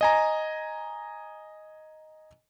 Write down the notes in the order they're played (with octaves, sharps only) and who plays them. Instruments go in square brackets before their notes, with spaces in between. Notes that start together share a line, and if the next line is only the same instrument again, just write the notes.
[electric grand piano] D#5 G#5 A#5